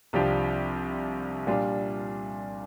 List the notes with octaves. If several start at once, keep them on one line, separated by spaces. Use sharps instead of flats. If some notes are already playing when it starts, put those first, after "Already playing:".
C2 C3 F3 D4 G4
A#2 G3 D4 F4